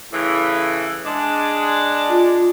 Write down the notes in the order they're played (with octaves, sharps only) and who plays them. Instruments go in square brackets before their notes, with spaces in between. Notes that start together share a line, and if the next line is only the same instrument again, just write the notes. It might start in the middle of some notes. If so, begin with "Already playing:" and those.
[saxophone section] A2 C#3 E3
G#3 D4
[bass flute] F4